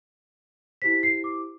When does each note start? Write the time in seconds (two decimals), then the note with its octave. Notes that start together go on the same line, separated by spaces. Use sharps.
0.82 E4 G4 C5 B6
1.03 C7
1.24 D6